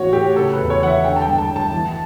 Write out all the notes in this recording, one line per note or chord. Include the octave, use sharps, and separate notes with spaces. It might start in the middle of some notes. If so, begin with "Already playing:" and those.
Already playing: A2 E3 F#4 C#5
A2 G4
C#3 A4
B4
E2
C#5
E3 F#5
E5
D3 G5
A5
G5
G2
A5
G2
A5
E3